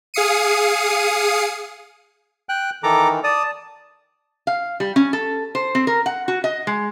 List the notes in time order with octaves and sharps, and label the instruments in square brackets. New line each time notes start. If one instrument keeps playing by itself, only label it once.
[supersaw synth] G#4 F5 D#6 C7 C#7 D#7
[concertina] G5 F#6
[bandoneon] D#3 E3 [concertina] A4 A#5 D6
[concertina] D5 D#6 [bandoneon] A5
[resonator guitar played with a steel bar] F5
G3
C#4
A4
C5
C4
A#4
F#5
F#4
D#5
G#3